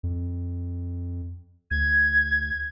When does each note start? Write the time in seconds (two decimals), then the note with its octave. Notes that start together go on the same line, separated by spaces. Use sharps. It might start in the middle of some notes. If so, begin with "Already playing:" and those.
0.03 F2
1.71 D2 G#6